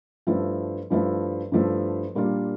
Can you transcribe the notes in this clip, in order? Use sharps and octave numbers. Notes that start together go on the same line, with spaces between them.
G2 F3 A3 E4
G2 F3 A3 E4
G2 F3 A3 E4
A#2 G3 A#3 D4 F4